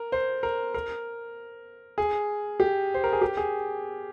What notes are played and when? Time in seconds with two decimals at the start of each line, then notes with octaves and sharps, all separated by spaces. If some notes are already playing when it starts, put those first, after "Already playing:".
Already playing: A#4
0.12 C5
0.43 A#4
0.74 A#4
1.98 G#4
2.60 G4
2.94 C5
3.04 A#4
3.13 G#4
3.22 G4
3.37 G#4